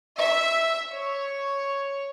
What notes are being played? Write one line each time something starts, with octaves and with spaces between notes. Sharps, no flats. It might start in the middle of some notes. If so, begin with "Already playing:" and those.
E5
C#5